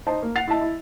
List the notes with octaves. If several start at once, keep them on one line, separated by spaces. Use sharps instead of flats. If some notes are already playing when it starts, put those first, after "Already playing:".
D#4 C5 A5
A#3
F#5 A6 C7 F7
E4 D#5 E5 A5
E4